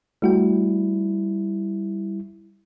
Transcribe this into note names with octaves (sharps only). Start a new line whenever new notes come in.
G3 A3 E4 F#4 G5